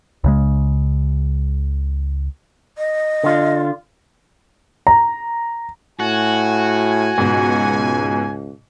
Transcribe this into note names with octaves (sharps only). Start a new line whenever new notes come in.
C#2 C#3 G#3
D#5
D3 F4
A#5
A2 F#4 G#5
C#2 G#2 B2